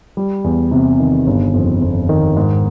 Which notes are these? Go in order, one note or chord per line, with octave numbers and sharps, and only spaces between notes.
G3
E2
C3
D#3
G1
F2
F2
D#3
G#2